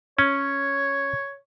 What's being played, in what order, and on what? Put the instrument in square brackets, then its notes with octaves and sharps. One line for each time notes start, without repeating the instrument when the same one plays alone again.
[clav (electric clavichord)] C#4 [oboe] C#5